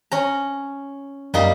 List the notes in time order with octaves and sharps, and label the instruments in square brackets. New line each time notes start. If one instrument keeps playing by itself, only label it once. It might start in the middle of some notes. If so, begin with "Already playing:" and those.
[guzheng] C#4 A#5
[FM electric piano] F#2 [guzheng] G3 A#3 D#4